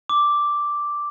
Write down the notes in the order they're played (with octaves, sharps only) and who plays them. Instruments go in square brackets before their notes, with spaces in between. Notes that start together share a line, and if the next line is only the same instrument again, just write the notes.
[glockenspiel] D6